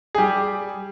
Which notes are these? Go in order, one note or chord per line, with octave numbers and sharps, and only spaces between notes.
G#4
G3 G4